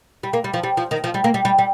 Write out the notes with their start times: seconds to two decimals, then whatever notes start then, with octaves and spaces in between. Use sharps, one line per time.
0.23 G3
0.33 A#3
0.44 G3
0.54 F3
0.63 G3
0.77 F3
0.91 D#3
1.04 F3
1.14 G3
1.24 A#3
1.34 G3
1.45 G3
1.58 G3